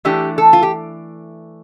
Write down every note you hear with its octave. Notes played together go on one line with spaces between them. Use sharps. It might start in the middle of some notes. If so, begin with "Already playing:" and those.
E3 A3 D4 G4
A4
F4
G4